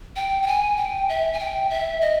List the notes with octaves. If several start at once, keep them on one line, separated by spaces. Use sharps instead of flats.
G5
G5
G#5
G5
E5
G#5
G5
E5
D#5